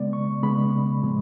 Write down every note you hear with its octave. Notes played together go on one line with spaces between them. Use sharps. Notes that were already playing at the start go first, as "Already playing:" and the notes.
Already playing: C#3 G#3 B3 D5
C#6
C#3 G#3 B3 B5
A2 F3 G#3